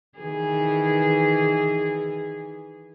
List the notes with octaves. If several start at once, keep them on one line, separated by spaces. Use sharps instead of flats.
D#3 E3 G#4